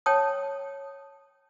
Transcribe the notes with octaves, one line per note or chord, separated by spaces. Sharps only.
C#5 G5 A5 D#6